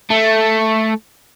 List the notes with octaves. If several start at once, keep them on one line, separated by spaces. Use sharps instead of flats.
A3